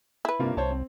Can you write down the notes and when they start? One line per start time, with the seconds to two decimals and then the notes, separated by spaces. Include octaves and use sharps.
0.25 E4 B4
0.40 G2 C3 A#3 F4
0.57 C2 C5 C#5 A5
0.71 C4